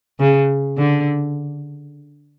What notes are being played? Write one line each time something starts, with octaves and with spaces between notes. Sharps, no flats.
C#3
D3